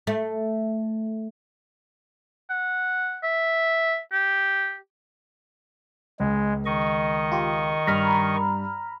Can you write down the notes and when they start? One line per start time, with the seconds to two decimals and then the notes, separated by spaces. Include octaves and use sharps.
0.07 A3
2.50 F#5
3.23 E5
4.12 G4
6.20 C#2 G#3
6.66 D#3 D#5 C#6
7.32 F4 G4
7.87 G2 A#5 B5 F6